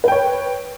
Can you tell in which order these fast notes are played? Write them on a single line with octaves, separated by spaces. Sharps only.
B4 G5 C#5